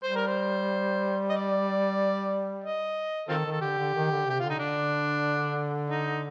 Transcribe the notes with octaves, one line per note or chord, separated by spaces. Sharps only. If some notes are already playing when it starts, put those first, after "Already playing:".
G3 C5
A#4
C5
D#5
D5
D#5
D#3 C4 F4 A4
D#3
A4
D3 G4
D3
D#3
D3
C3 G4
D3 F4
D#4
D3 D4
D#4